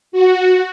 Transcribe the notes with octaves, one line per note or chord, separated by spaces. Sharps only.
F#4